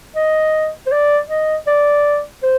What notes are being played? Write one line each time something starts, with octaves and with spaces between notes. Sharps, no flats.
D#5
C5
D5
D#5
D5
C5